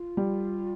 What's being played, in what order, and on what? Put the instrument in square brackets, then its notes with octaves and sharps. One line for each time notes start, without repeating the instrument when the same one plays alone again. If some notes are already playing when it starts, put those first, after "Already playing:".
Already playing: [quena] F4
[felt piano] G3